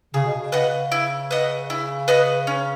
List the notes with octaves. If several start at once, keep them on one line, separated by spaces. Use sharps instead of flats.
C#3 G#4
B2
C#3
B4 D#5 F#5
E4
B4 D#5 F#5
E4
B4 D#5 F#5
C#4